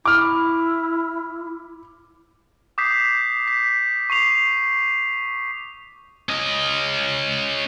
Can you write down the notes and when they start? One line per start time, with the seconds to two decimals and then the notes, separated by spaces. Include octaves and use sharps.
0.05 E4 D6 F6
2.78 D6 D#6 G6 B6 C7
3.48 B6
4.10 C#6 C7 F7
6.29 C#4 D#5